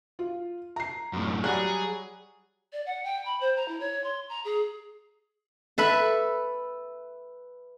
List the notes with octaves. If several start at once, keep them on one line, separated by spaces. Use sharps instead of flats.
F4
A#5 C7
F#2 A2
F#3 G3 F#4 G#4 F#6
D5
F#5
G5
B5
C5
A#5
E4
C#5
C6
A#5
G#4
A4 B4 E5 B5